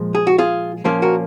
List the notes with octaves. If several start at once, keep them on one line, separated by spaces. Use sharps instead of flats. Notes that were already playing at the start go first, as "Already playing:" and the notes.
Already playing: A#2 F3 G#3
G#4
F#4
F4 G#4
A#2 F3 A#3 C#4 F4
F#4 A#4